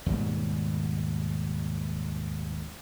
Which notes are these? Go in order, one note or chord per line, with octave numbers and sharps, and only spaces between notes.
D#2 G#2 B2 G3